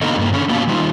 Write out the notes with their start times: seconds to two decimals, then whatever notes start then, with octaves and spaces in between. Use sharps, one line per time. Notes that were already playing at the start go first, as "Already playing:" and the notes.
0.01 D3 A#3 B3 D#4
0.18 G2 A#3
0.33 D3 C#4
0.49 A#3 B3 F#4 F5 A5
0.67 D#3 G3 D#4 F4